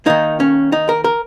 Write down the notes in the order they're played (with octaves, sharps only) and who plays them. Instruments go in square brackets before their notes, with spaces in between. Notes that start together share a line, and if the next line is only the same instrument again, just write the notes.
[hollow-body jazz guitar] D#3 A#3 D#4
C#4
D#4
A#4
A#4